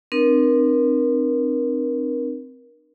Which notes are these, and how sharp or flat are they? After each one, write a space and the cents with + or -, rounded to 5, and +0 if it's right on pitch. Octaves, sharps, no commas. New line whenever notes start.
C4 +0 D#4 -45 A#4 +30